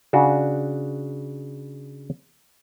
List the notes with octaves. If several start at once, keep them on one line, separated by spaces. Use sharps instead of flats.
C#3 D4 F#4